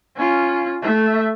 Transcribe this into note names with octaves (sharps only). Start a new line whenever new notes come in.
C#4 F4
A3 E5